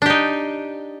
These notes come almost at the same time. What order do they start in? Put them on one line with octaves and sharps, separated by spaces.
D4 G4 D#4